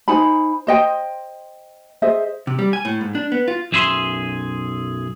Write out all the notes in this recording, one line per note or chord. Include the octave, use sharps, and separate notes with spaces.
D#4 C5 G#5 B5
C5 D#5 G5
G#4 C5 D#5 E5
C3
G3
G#5
A2
G#2
D4
B3
F4
B1 F#2 G#4 E5 A#5 C6